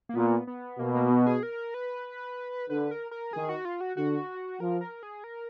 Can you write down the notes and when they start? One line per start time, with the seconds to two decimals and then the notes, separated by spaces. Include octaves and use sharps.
0.09 A#3
0.15 A#2 B3
0.47 B3
0.79 B2 A#3
0.95 A#3
1.10 B3
1.27 G#4
1.43 A#4
1.74 B4
2.70 D3 B4
2.91 A#4
3.11 A#4
3.33 D#3 G#4
3.49 F#4
3.65 F4
3.81 F#4
3.97 D3 F#4
4.60 F3 A#4
4.81 A#4
5.03 G#4
5.24 A#4